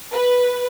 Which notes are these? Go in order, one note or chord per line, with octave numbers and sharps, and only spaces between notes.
B4